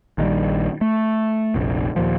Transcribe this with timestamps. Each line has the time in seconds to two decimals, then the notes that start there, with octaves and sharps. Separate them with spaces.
0.18 A#1 D#3 F3 G3
0.81 A3
1.55 F1 A#1
1.96 D#2 A#2 F3